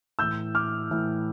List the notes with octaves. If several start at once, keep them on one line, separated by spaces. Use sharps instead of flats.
A2 E3 E6 G6
D6 F6
A2 E3